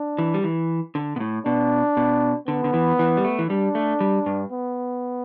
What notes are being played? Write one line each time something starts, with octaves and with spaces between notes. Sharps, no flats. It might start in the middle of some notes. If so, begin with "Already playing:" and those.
Already playing: D4
E3
G3
E3
D3
B2
A2
B2 D4
B2
D3 B3
D3
E3
E3
G3
A3
E3
G3 D4
A3
G3
G2
B3